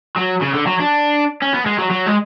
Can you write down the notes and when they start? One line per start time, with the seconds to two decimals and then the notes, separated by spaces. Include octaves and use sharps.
0.17 F#3
0.42 C#3
0.54 D3
0.67 F#3
0.80 D4
1.42 C#4
1.54 B3
1.66 G#3
1.79 F#3
1.91 F#3
2.07 G#3